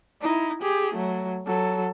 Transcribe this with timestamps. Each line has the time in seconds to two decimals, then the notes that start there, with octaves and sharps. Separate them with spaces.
0.22 D#4 E4
0.62 G4 G#4
0.95 F#3 A3
1.46 F#3 A4